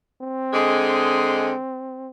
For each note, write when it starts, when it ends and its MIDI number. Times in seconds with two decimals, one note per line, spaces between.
0.21 2.10 60
0.53 1.51 50
0.53 1.51 56